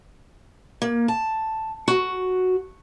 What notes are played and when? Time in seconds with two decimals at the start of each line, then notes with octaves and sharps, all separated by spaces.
0.82 A#3
1.08 A5
1.88 F#4